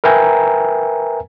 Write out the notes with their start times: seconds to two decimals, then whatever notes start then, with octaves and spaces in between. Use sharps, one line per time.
0.04 A#4 B4 E5 G5 G#5 A#5